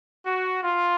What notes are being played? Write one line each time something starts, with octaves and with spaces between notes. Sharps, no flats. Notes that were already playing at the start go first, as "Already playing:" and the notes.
F#4
F4